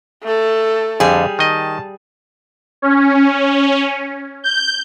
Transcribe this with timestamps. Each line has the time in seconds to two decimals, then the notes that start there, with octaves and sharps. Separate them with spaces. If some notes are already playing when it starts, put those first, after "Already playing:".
0.23 A3 A4
1.00 F2 D3 G3 G#4
1.39 D#3 D#5 A5
2.82 C#4
4.44 G6